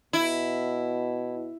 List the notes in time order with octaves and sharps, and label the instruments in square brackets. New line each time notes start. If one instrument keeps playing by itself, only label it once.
[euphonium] B2 [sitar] E4